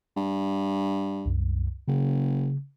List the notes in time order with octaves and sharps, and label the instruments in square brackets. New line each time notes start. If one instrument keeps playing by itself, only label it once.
[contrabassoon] G2
[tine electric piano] C2 F#2
[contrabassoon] F#1 [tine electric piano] C#3